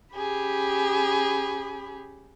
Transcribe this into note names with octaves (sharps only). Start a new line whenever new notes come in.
C#4 G4 G#4 B5